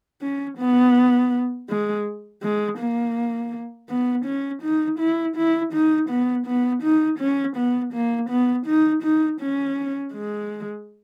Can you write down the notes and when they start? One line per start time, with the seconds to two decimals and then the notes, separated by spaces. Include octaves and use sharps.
0.22 C#4
0.58 B3
1.69 G#3
2.43 G#3
2.79 A#3
3.89 B3
4.25 C#4
4.62 D#4
4.99 E4
5.37 E4
5.73 D#4
6.10 B3
6.47 B3
6.83 D#4
7.19 C#4
7.57 B3
7.94 A#3
8.30 B3
8.67 D#4
9.03 D#4
9.41 C#4
10.14 G#3